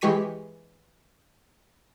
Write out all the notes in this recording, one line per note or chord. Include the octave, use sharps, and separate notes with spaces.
E3 G#3 G4 C#6 B6 D#7